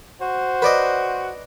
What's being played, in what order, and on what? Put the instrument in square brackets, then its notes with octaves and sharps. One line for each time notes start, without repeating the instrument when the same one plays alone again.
[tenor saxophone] F#4 [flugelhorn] C5
[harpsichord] B4 D5 D#5